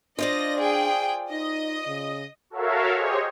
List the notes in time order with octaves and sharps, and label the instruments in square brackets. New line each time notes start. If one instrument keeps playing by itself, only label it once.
[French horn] D4 [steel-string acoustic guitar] F4 C5 D5 [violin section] D#5 A#6
[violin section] G#4 G5
[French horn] D#4 [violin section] D#5
[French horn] C#3
[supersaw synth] F#4 A4 A#4 C#5 E5 F5
G4 G#4 C5 C#5 D#5